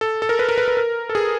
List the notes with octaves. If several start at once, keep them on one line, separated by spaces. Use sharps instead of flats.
A4
A4
A#4
B4
A#4
B4
B4
A#4
A4
G#4